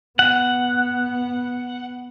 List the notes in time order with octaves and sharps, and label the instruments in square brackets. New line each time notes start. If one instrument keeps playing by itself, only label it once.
[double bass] B3 [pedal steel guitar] F#5